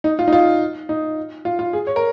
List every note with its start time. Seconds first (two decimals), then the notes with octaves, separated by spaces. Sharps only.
0.04 D#4
0.19 F4
0.28 D#4
0.33 F4
0.89 D#4
1.45 F4
1.59 F4
1.73 G#4
1.87 C#5
1.96 A#4